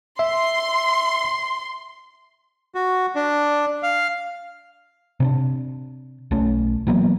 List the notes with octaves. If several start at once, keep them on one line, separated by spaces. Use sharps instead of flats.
E5 C6
F#4
D4
F5
C3 C#4 D4
B1 A3 C#4
E3 F#3 A#3 B3